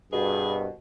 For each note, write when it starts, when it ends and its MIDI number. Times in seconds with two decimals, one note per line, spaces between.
0.12 0.71 36
0.12 0.67 43
0.12 0.71 47
0.12 0.61 68